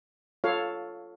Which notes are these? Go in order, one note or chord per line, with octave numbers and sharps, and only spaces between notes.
F4 A4 C#5 F5